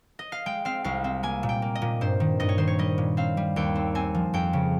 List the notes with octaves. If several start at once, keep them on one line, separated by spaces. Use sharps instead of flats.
D#5
F5
G#3 G5
C4 F5
C2 F5
C4
A#3 G#5
A#2
G5
A#3
D#5
A#2
G2 C5
D#3
G2 D#5
C#5
D#3 C5
C#5
G3 D#5
A#2
C4 F5
G3
D#2 G5
C4
C4 G#5
F3
F2 G5
C#3